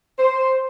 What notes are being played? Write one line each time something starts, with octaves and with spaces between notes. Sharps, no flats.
C5